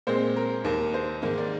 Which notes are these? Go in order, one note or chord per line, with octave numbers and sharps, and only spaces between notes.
A#2 G#3 C4 C5
A#4
D#2 D#3 A#3
C5
G#2 D#3 A#3
D5